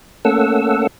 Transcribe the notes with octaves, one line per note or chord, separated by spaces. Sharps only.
A3 A#3 C#4 A4 F#5 E6